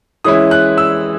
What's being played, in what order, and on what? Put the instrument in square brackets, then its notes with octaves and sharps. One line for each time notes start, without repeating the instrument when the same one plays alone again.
[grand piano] E3 G#3 C#4 E4 D#6
F#6
E6